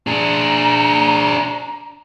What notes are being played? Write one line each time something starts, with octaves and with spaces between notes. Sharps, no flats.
D4 G#4 A#5